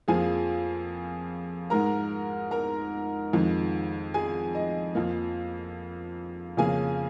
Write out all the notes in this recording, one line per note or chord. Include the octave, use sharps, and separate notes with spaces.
F2 F3 A#3 G#4 G#5
G#2 G#3 A#4 A#5
A#4 A#5
F2 D#3 G#3
G#4 G#5
D#5
F2 F3 A#3
F2 C#3 A#3 G#4 G#5